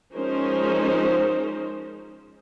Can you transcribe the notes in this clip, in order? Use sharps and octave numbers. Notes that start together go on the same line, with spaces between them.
F3 G#3 C#4 D#4 A#4 C5